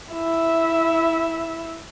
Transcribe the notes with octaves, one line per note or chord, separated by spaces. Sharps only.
E4 E5